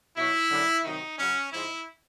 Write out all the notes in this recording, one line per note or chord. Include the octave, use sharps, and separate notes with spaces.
B2 F#3 E4
F#2 D3 G3
C3 D#3 F#3 D#4
F#2 C#3 F#3 C#4
G#2 F3 G#3 E4